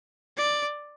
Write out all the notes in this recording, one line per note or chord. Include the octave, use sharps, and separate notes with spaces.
D5